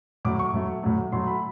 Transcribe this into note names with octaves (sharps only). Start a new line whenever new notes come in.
A2 F#3 A3 D6
C#6
A2 F#3 A3
A2 F#3 A3
A2 F#3 A3 C6
B5